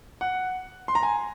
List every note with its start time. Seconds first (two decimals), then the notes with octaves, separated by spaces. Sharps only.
0.21 F#5
0.88 C6
0.95 A#5
1.03 G#5